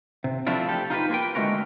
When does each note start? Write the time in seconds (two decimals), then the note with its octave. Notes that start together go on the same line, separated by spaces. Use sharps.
0.24 C3
0.47 F3 A3 C4 D4 E4 F4
0.69 G4 A4
0.90 D#4 F4 G4 B4
1.09 A#3 F4 B4 G5
1.35 D3 G#3 A3 C#4 F#4 A#4